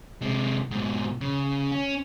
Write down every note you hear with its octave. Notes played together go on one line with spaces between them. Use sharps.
C3 G#3
G#2 B2
C#3
C#4